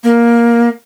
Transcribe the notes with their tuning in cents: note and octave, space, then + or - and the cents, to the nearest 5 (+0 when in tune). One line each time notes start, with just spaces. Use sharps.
A#3 +10